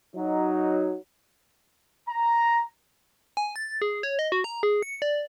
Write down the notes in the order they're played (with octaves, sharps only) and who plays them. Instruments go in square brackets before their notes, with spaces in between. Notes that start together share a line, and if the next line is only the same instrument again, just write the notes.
[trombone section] F#3 D#4
[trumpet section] A#5
[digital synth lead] G#5
A6
G#4
C#5
D#5
F#4
A#5
G#4
C#7
D5